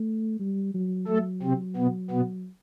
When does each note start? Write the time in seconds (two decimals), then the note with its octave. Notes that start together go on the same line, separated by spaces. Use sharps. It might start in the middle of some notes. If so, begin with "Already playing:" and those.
Already playing: A3
0.40 G3
0.74 F#3
1.08 F#3 A3 A4
1.42 C3 C4
1.77 B2 B3
2.11 B2 B3